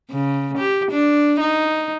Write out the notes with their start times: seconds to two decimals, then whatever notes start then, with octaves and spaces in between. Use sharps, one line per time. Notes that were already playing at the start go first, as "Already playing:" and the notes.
0.11 C#3
0.58 G4
0.91 D4
1.40 D#4